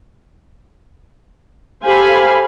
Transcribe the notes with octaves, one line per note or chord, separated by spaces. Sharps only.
G4 A4 C5 F5 G#5 B5